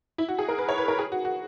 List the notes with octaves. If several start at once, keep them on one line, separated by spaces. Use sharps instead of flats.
E4
F#4
G#4
A#4
B4
C#5
B4
A#4
G#4
F#4
F#4